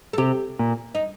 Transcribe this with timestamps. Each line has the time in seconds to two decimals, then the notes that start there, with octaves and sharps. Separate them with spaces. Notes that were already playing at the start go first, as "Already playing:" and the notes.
0.13 A4
0.18 C3 G4
0.59 A#2
0.95 D#4